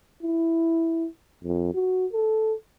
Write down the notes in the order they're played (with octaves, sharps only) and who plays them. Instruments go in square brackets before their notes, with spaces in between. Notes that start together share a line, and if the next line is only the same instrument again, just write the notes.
[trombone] E4
F2
F#4
A4